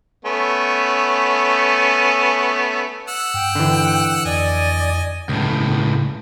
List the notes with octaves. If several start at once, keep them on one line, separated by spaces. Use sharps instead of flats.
A3 B3 C#4
F#5 E6
G2 G5
D3 E3
F2 D5 D#5 G#5
C#2 A2